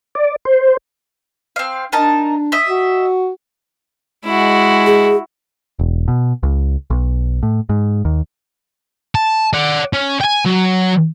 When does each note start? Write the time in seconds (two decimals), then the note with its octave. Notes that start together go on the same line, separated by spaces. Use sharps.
0.15 D5
0.45 C5
1.56 C4 F5
1.92 D4 D#4 A#4 A5
2.52 D#5 E5
2.68 F#4
4.25 G#3 E4 F#4
4.86 G#4
5.79 E1
6.08 B2
6.43 C#2
6.90 B1
7.43 A2
7.69 G#2
8.05 D#2
9.15 A5
9.54 D5 F#5
9.93 C#4
10.20 G5 G#5
10.45 F#3